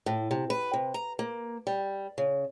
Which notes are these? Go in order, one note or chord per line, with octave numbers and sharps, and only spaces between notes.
A2
C3
B4
C3
A#5
A#3
G3
C#3